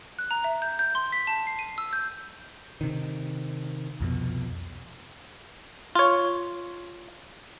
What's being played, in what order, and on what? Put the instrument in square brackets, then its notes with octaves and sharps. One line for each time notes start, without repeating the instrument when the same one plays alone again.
[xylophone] F#6
A#5
E5
G6
G6
C6
B6
A5
C7
D#7
E6
G6
[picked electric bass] C3 D#3
C2 F2 B2
[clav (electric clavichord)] F4 C#5